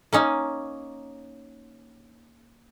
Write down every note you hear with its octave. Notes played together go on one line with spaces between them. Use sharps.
A#3 C#4 D#4